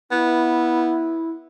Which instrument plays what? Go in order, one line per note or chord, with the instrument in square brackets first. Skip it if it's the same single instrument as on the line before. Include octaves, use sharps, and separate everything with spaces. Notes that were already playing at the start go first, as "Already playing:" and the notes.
[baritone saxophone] B3 [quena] E4